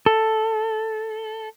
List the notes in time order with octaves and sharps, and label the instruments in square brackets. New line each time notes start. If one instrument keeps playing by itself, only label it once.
[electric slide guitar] A4